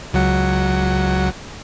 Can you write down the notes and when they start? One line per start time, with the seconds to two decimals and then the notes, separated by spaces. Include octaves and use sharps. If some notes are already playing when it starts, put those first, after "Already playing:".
0.14 C#2 F#3 F#5